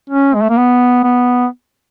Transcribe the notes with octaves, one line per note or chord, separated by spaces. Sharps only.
C#4
G#3
A3
A#3
B3
B3